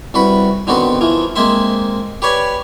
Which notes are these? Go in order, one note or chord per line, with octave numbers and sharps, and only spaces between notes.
C2 F#4 B4 B5
D3 D#3 B3 C4 F#4
E3 F3
G#3 A#3 C4 C5 E5
G4 B4 C#5 D5 G#5